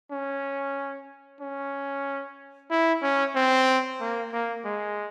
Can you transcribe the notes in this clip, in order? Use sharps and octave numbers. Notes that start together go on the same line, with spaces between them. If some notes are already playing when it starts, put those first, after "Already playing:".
C#4
C#4
E4
C#4
C4
A#3
A#3
G#3